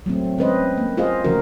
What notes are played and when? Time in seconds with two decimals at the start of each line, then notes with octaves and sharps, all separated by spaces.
0.06 F#3 A3 C4
0.38 G#3 C4 C#4 B4 C5 D#5
0.78 A#3
0.97 F4 G#4 C5 D#5 F5
1.24 C#3 F3 A3 C#4 F#4 A#4